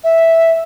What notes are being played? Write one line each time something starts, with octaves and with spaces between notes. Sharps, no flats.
E5